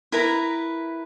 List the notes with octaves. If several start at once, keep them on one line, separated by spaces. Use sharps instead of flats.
E4 A#4 B4 A#5